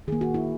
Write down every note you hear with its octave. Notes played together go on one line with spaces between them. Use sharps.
D#3 A#3 G#4
F#4
E4